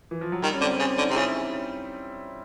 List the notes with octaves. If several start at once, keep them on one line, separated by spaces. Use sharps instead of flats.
E3
F3
F#3
D#3 G3
C#4
D3 C4
C#3 C#4
D3 D#4
C3
C#3 E4